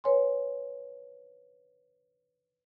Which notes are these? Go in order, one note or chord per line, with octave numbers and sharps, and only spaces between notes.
B4 C#5 G#5 C6